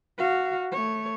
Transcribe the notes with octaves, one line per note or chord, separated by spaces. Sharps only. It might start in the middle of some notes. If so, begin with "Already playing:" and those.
F#4 F5
A3 C#5